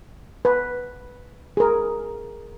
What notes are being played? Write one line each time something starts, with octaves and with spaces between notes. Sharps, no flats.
B4
G#4 A#4